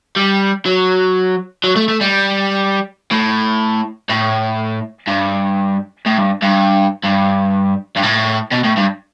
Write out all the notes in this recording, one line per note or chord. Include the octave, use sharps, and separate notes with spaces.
G3
F#3
F#3
A3
A3
G3
A2
A2
G2
A2
G2
G2
G2
G2
A2
B2
A2
G2